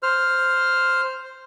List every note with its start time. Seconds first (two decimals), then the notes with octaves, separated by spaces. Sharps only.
0.03 C5 F6